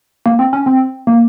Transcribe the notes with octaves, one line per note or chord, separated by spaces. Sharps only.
A#3
C4
C#4
C4
A#3